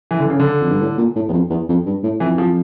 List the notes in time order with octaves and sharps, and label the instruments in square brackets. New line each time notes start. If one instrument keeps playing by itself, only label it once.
[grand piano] E3
D3
C#3
D3
[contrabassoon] F2
G2
A2
A#2
A2
E2
F2
E2
F2
G2
A2
[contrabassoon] F2 [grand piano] E3
[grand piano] F3